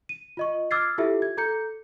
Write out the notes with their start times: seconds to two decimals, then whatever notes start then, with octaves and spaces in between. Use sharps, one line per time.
0.09 D#7
0.37 F4 D#5 C#6
0.71 D6 E6 F6 G#6 A6 C7
0.98 E4 F4 G4 A4 E5
1.22 G#6
1.37 A4 A#5 G6 C#7